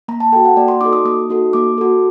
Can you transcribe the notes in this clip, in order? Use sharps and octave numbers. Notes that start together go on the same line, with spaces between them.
A#3 A#5
A5
F#4 A4 G5
F#5
A#3 D5
C6
D#4 F#4 A4 D6
D#6
A#3 D#6
D#4 F#4 A4
A#3 D6
F#4 A4